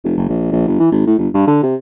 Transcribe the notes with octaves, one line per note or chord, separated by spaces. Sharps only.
F1
F#1
A#1
A#1
G1
E3
G#1
A2
G1
G2
D3
C3